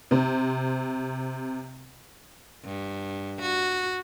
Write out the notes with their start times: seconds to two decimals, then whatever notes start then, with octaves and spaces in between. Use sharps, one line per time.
0.11 C3 C4
2.65 G2
3.42 F#4